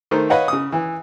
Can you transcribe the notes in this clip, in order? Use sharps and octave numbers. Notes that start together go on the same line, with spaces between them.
D#3 A3 D#4 C5
B4 C#5 D#5 F5 F#5
C#3 D#6
E3